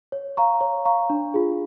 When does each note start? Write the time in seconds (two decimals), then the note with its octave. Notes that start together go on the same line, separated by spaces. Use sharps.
0.12 C#5
0.37 F5 A#5 C#6
0.61 C#5
0.85 F5 A#5 C#6
1.10 D4
1.34 F4 G#4